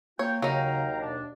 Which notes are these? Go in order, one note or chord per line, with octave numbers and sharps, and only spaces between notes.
A#3 F4 C#5 G5
D#2 C#3 F#3 D#4 F5 G5 A#5
B2 D4